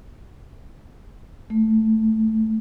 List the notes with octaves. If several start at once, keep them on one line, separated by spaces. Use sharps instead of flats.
A3